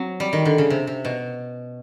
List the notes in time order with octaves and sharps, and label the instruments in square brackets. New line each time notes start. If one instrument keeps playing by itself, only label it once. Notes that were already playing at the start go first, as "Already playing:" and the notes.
Already playing: [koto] F#3 [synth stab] C4
[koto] G3
D#3
D3
C#3
C3
C3
B2